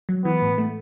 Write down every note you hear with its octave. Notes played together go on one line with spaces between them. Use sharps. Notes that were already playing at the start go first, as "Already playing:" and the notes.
F#3
E3 B3
A2
A3